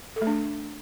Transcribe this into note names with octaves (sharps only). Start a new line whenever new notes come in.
A4
A3
D4